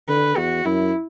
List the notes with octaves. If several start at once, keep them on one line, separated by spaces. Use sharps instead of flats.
D3 B4
E2 F#4
F#2 E4